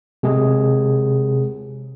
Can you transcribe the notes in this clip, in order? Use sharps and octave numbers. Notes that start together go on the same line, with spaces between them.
C3 G#3 G#4